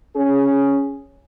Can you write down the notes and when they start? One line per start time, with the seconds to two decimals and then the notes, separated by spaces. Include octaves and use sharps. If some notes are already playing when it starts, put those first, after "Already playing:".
0.16 C#4 G#4